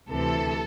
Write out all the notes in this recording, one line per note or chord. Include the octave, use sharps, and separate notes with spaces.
D2 C3 E3 A4